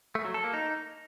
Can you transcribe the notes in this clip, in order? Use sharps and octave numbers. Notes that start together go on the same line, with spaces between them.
A3
F#3
A4
A#3
D#4